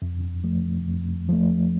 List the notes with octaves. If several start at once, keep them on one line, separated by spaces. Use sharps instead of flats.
F2
F3 A3
F2
F3 A3